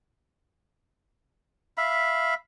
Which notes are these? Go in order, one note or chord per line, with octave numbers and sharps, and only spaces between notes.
E5 F5 B5